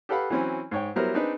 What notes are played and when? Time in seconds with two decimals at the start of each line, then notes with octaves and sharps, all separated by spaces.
0.09 G4 A4 B4 F5 F#5 B5
0.30 E3 F#3 C4 C#4 B5
0.71 G#2 C#5 G5
0.96 F#3 G3 B3 E4 A#4 C5
1.14 C4 D4 D#4 G#4 B4